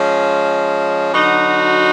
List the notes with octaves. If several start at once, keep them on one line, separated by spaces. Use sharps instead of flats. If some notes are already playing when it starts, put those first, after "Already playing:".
Already playing: F3 G#3 C#4
D3 F#3 B3 D#4 F#4